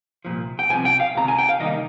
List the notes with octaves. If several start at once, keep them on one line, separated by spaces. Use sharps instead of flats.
C2 A#2 F3
G5
C2 C3 F3 C4 G#5
G5
F5
C#2 C3 D#3 A#5
G#5
G5
F5
C3 D#3 G3 A#3 D#4 D#5